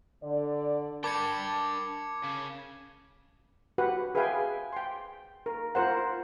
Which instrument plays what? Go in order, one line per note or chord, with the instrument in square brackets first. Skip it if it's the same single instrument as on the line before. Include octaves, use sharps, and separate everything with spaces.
[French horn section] D3 D5
[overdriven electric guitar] D4 G5 [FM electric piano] A#4 A5 B5 [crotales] D6 G#6 C#7
[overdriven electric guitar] C#3
[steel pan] F#4 G4 B4 F#5
G#4 B4 E5 F5 G5 G#5
G5 C6
A#4
F4 A#4 C5 F#5